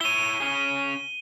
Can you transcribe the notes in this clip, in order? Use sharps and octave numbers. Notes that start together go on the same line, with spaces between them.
E4 C#5 D#7 G7
C#4 G#4